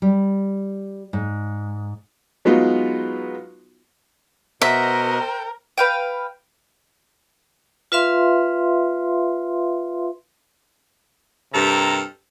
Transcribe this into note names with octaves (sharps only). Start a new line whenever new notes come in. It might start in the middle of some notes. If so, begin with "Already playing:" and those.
G3
G#2
F#3 G#3 B3 D#4 F4 F#4
B2 A#4 C5 D#5 E5 F#5
G5
B4 F5 G5
F4 B4 E5 F5 C6
G2 C3 G4 A4 A#4 A#5